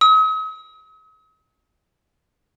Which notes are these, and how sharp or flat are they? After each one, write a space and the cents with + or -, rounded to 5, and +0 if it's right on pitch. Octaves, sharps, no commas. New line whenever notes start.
D#6 +45